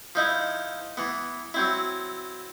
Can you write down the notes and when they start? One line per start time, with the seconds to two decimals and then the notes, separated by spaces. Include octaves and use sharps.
0.15 F3 D#4 E4
0.97 E3 B3
1.54 F#3 C4 E4